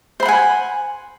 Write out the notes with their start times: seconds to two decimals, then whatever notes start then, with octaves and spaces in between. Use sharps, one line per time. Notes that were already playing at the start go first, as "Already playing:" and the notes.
0.20 C5
0.23 B5
0.26 F#5
0.28 G#5